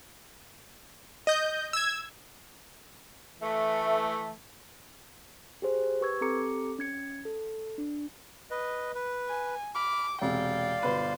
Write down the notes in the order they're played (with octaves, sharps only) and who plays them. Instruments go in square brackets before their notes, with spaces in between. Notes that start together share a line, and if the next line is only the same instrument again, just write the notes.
[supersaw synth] D#5 G6
E6 G#6
[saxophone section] E3 A3
[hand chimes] G4 G#4 C5
G4 B4 C#6 E6 G#6
C4 G4 A4 A#5 D6 C#7
C#4 G#6 C#7
A4
D4
[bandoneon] B4 D#5
B4
[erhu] G#5
[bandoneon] B5 F6 [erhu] D6
[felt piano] E1 C3 [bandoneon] D5 F5 [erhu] G5
[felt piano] G1 B2 B4 [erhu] C5